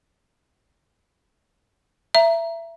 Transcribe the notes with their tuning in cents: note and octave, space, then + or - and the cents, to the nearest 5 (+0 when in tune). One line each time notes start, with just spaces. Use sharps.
E5 +20 A#5 +10